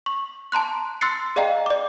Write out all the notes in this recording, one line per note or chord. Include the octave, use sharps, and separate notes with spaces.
C#6
A5 A#5 C6 F#6
C6 E6 F#6 A6 C7 C#7
G#4 D5 D#5 F5 G5 A#5
D5 D6